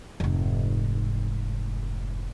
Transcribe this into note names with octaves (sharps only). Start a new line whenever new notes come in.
F1 G#2